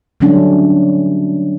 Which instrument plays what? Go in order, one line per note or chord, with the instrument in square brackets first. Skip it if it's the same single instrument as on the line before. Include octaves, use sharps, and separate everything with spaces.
[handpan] D3 F#3 G3 A3 C#4 D4